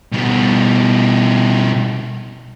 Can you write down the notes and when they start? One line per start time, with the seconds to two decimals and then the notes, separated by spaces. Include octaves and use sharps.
0.12 B2 G3